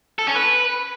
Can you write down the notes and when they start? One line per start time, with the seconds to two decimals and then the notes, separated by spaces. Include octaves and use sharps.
0.19 A4
0.27 C#4
0.35 B4